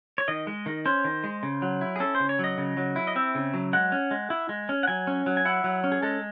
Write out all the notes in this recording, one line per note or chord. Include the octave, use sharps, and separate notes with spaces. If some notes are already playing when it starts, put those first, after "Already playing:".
C#5
D#3 D#5
G#3
D#3
C#4 C5
D#3
G#3
C#3
F#3
E4
G#4
C#4 A4
C5
C#3
C#5
F#3 D#5
C#3
F#3
E4
D#5
C4 E5
C#3
F#3
G#3 F#5
C#4
G#3
E4
G#3
C#4
F#5
F#3 G#5
C#4
F#3
G#5
E4 F#5
F#3
C#4
G#4
G#3 A4